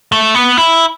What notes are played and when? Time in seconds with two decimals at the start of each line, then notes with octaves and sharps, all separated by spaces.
0.12 A3
0.35 B3
0.57 E4